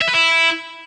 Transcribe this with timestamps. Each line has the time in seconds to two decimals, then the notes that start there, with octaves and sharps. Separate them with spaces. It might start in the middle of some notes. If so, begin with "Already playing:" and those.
0.01 E5
0.07 B4
0.14 E4